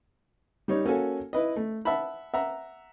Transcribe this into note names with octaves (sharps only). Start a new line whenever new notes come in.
G3 D#4 C#5
A#3 C#4 F#4 A4 G#5
E4 B4 D#5
A3
E5 F#5 A5 B5
E5 F#5 A#5